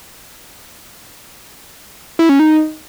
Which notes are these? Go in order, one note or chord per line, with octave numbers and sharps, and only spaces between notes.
E4
C#4
D#4